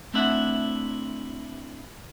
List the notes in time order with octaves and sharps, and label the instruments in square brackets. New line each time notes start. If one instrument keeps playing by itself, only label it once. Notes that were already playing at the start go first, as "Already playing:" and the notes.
[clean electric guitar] A3 C4 D4 E4 E5 F#5